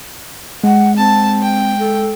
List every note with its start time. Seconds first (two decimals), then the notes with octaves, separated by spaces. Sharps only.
0.63 G#3 F#5
0.97 C4 A5
1.42 G5
1.79 A4